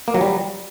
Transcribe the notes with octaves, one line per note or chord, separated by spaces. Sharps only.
A#3
F#3
G3